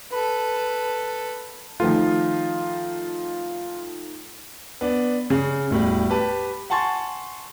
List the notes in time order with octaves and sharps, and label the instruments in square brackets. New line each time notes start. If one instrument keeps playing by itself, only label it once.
[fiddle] A4 B4
[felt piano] D#3 F3 A3 [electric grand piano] F4
[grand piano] B3 D4
C#3
E1 A2 G3
G4 B4 A5
F#5 G#5 A5 C6 C#6 A6